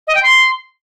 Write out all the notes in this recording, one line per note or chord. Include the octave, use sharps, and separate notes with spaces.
D#5
G5
C6